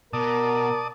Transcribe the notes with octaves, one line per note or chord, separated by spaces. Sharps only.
B2 A#4 D5 A5 D#6